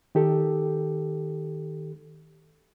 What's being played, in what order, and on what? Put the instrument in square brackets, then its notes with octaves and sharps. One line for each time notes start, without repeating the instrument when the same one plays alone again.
[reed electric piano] D#3 G4 A4